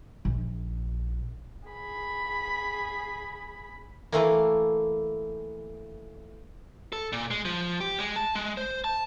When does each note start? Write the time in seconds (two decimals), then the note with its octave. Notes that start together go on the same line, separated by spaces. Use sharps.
0.25 A#1
1.69 G#4 B5
4.12 E3 A3 A#3
6.93 A4
7.13 A#2
7.31 G#3
7.45 F3
7.80 G4
7.99 G#3
8.16 A5
8.35 G#3
8.57 C5
8.84 A5